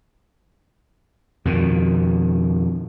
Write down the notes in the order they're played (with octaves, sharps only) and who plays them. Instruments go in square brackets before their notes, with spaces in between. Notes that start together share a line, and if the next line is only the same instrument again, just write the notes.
[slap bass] F2 B2 D#3